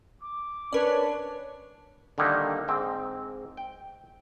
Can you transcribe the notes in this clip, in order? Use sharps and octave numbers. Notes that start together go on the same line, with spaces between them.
D6
C#4 D4 A#4 B4 C#5 D5
D3 D#3 G3 A#3 D#4
G#2 C4
G5